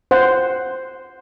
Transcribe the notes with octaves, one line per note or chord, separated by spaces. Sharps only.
C5 F#5